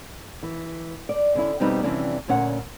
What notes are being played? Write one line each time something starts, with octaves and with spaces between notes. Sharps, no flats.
E3
D5
D3 C#4 E4
F2 B2 G3 C4 D#4 B4
F2 C3 E3 G3 C#4 D4
D2 A#2 C#4 C#5 F#5